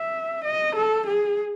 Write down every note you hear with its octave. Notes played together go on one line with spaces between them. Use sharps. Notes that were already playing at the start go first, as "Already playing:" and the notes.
Already playing: E5
D#5
A4
G#4